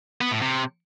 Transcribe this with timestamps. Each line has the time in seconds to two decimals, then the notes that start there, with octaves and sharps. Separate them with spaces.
0.21 B3
0.31 A2
0.42 C3